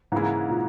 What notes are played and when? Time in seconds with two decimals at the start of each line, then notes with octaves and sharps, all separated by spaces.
0.12 G#2 C#3 E3 A#3 E4 G#4
0.50 A#2